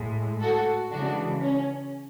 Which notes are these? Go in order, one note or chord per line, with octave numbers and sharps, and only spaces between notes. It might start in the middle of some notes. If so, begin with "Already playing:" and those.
Already playing: A2 G#3
F#4 A4
C#3 E3 G#3 D4 F#4
C#4